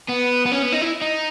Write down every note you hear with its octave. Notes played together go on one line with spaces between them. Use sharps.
B3
B3
C#4
B3
D#4
E4
D#4